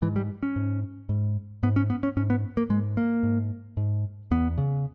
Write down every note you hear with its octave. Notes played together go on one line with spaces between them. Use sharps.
G#2 E3
G3
C#4
G#2
G#2
G#2 B3
C#4
B3
C#4
G#2 C#4
B3
A#3
G#2 G#3
A#3
G#2
G#2
E2 B3
C#3